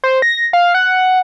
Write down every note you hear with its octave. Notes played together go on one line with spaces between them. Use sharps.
C5
A#6
F5
F#5